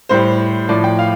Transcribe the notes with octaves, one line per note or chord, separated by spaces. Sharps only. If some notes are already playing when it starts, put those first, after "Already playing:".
A2 G3 C5
A2 F3 D5
G5
F5